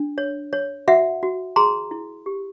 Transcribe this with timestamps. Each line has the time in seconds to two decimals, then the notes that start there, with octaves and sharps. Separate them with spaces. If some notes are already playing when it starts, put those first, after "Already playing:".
Already playing: D4
0.18 C#5
0.53 C#5
0.88 F#4 E5 F#5
1.23 F#4
1.56 G#4 A#5 C6
1.91 E4
2.26 G4